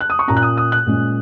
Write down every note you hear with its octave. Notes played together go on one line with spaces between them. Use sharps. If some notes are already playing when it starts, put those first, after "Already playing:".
F#6
D#6
C#6
A#2 A#3 C#4 A#5
F#6
D#6
D#6
F#6
A#2 G#3 C#4